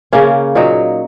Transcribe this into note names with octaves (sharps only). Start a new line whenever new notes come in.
C#3 A#3 C#4
A#2 F#3 D#4